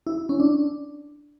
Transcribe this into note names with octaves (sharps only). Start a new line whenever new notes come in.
E4
C#4
D4